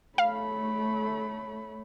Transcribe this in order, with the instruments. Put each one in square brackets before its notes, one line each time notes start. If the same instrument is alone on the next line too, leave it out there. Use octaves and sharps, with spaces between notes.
[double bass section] A3 [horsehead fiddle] C#5 B5 [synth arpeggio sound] F5